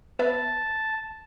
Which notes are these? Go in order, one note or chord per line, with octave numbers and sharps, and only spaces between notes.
B3 B4 E5 A5